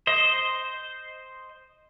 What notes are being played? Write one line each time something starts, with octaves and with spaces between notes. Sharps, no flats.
C5 D#5